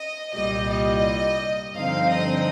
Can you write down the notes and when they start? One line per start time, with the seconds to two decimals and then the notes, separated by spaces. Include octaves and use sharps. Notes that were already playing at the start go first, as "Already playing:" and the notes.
Already playing: D#5
0.32 C2 A#2 G3 D#5
0.69 D#5
1.74 G2 D3 F3 C4 D#4 F5
2.09 D#5